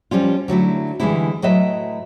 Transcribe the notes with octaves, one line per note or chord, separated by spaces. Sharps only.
F3 G3 C#4 F4
D3 F#3 A3 E4
D3 E3 G3 G#3 A#3 E4
A2 F#3 B4 D#5 E5